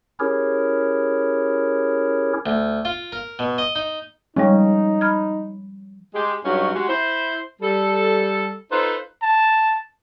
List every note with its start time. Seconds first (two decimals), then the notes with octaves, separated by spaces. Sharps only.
0.20 C#4 E4 G4 G#4 A#4 C#5
2.46 D2
2.85 F4
3.12 A#4
3.39 B2
3.58 D#5
3.76 D#4
4.36 F3 G3 G#3 C#4 D#4
5.01 B5 F6 G#6
6.14 G#3 G4
6.44 G2 F#3 G#3 C#4 D#4 F#4
6.74 G#3 F#4 G4
6.89 E4 C5
7.62 G3 A4
8.71 D#4 F4 A4 B4 C5
9.22 A5